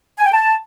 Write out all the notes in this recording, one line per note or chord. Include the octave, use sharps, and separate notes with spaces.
G#5
G5
A5